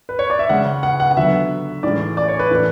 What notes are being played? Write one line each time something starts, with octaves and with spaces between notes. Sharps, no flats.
B4
C#5
D5
E5
C#3 G#3 C#4 F#5
F#5
F#5
F#5
D3 F#3 B3 E5
A2 E3 G#3 C#4 D5
D5
C#5
B4
A2 E3 A3 C#4